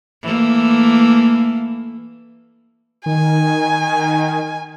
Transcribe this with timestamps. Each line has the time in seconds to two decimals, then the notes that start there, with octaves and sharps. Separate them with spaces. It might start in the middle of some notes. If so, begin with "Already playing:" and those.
0.23 E3 A3 A#3
3.06 D#3 G#5